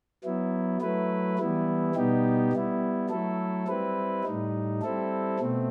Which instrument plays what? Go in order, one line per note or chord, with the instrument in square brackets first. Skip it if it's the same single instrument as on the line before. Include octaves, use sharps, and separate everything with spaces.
[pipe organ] F#3 B3 E4
F#3 A3 E4 B4
E3 G3 B3 E4
B2 G3 B3 D#4 G4
G3 B3 E4
F#3 A3 E4 A4
G3 C4 E4 B4
A2 G3 D#4
G3 C4 E4 A4
B2 A3 C4